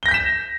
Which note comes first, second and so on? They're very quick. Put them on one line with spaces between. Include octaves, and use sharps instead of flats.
G7 A#6 G6 B6 E7